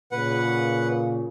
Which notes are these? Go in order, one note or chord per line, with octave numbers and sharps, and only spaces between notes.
A#2 C#3 B4 F#5